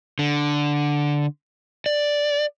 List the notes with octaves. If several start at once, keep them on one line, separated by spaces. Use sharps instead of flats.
D3
D5